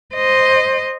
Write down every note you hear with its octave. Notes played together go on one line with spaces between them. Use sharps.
C5 D#5